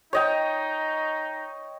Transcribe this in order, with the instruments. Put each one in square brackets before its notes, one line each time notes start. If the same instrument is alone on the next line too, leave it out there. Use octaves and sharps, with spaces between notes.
[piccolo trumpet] D#4 [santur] C#5 D#5 G5